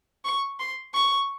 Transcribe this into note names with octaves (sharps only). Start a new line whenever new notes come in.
C#6
C6
C#6